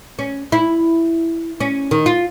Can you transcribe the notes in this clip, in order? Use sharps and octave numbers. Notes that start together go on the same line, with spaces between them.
C#4
E4
C#4
D#3
F4